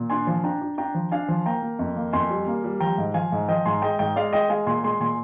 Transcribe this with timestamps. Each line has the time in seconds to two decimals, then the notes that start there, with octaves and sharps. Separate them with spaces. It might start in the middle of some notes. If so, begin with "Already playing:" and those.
Already playing: A#2
0.10 D4 G#5 C6
0.27 F3
0.43 D4 G5 A#5
0.62 D4
0.78 D4 G5 A#5
0.94 F3
1.11 D4 F5 G#5
1.29 F3
1.46 A#3 G5 A#5
1.62 A#3
1.79 F2
1.96 A#3
2.13 F2 G#5 C6
2.30 G3
2.48 A#3
2.64 G3
2.80 F3 G5 A#5
2.98 G#2
3.14 F3 F5 G#5
3.32 G#2
3.48 F3 D#5 G5
3.65 G#2 G#5 C6
3.82 G#3 D#5 G5
3.99 G#2 D#5 G5
4.16 G#3 D5 F5
4.33 G#3 D#5 G5
4.49 G#3 F5 G#5
4.67 A#2 G#5 C6
4.84 G#3 G#5 C6
5.00 A#2 G#5 C6